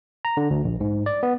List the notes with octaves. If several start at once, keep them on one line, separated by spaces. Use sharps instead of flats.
A#5
D3
D2
A#1
G#2
D5
B3